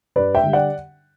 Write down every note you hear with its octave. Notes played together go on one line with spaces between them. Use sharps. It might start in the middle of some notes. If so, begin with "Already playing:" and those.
G2 B4 D5
E5 G5
D3 G3
D5 F#5